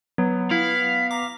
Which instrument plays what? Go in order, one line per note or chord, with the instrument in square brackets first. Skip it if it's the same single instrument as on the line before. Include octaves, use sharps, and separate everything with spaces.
[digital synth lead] F#3 [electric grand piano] B3
[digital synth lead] E4 [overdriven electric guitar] F5 [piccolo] B6
[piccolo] A#5 [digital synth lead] D6